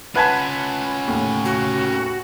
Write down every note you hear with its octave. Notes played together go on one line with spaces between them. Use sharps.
C#4 F4 B4 F#5 G#5 A5 B5
D#2 A2
F#4